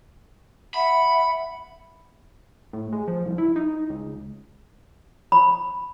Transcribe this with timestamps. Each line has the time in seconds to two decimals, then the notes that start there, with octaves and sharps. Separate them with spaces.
0.74 E5 F#5 B5
2.73 A2
2.93 G#3
3.08 F3
3.25 C2
3.38 E4
3.56 D#4
3.90 C#2
5.32 B5